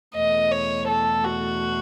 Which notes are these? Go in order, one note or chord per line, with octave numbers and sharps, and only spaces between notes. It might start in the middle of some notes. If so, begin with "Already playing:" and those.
E2 B2 A3 D#5
C#5
A4
F#4